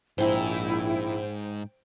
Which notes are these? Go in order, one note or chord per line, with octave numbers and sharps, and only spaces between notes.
A#1 G#2 E4 C5 G5